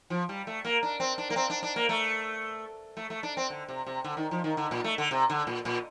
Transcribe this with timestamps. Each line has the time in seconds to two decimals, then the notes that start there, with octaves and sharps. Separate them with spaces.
0.10 F3
0.29 G3
0.47 A3
0.65 A#3
0.83 D4
1.00 C4
1.18 D4
1.30 A#3
1.36 C4
1.50 D4
1.63 D4
1.76 A#3
1.89 A3
2.97 A3
3.10 A3
3.23 D4
3.37 C4
3.50 D3
3.68 C3
3.86 C3
4.04 D3
4.17 D#3
4.31 F3
4.44 D#3
4.57 D3
4.71 A#2
4.84 A3
4.98 D3
5.11 C3
5.30 D3
5.47 A#2
5.65 A#2